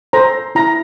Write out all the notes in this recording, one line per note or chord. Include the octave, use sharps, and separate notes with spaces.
A4 C5 A#5
E4 A#5